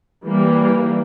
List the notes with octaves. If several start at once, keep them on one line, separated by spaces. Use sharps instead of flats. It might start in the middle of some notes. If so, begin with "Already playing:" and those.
E3 G3 A#3